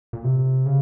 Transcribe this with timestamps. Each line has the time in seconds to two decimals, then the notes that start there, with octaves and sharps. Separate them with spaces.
0.13 A#2
0.25 C3
0.66 C#3